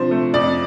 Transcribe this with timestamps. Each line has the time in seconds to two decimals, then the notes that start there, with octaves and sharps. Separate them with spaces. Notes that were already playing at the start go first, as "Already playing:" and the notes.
Already playing: C3 F3 D4 C5
0.11 A3
0.34 F2 D5